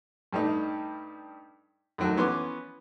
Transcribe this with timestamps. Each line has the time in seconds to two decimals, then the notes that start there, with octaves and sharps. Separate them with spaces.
0.33 G2 G3 A3 D#4
1.98 F#2 D#3 F#3 A3
2.17 E3 B3 C#4 C6 D6